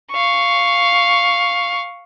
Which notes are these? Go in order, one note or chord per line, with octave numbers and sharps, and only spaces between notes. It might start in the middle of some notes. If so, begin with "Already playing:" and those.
F5 C#6